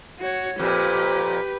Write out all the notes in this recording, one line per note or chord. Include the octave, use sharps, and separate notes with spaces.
F#4 C#5
F2 A#2 G4 B4